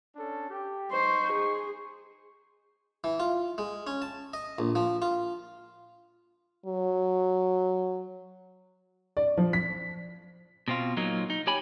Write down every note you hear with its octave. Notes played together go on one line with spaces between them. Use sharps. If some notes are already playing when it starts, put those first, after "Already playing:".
C#4 D4 A4
G4
D#4 C5 C#6
G#4
E3
F4
G#3
C#4
A5
D#5
A#1
F3
F4
F#3
D5
F3
B6
B2 C4 F4
A#2 F#3 A#3 D#4
D#4
G4 C#5 G5 G#5 B5